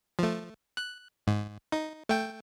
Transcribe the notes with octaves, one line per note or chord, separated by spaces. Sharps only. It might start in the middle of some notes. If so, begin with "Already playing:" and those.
F3 A3
F#6
G#2
D#4
A3 G5